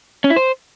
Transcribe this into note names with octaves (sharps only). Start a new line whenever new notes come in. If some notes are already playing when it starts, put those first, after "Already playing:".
C#4
E4
C5